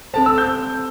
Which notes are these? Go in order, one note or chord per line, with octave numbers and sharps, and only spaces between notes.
C4 A4 C5 A5
E6
G6